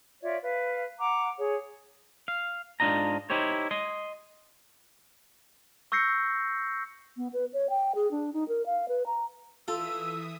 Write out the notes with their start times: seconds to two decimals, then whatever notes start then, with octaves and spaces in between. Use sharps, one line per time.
0.22 F4 C#5 D5 E5
0.42 B4 F5
0.99 F#5 A#5 D6
1.39 G#4 C#5
2.28 F5
2.80 G#2 D4 F4 D#5 A#5
3.30 D#4 E4 G4 C5 C#5
3.71 D#5 C6
5.92 C#6 E6 G6 A#6 C7 C#7
7.17 B3
7.33 B4
7.53 C#5
7.70 G5
7.95 G#4
8.11 D4
8.33 D#4
8.48 A#4
8.66 F5
8.89 B4
9.06 A#5
9.68 E3 F4 A4 E5 D#6 E6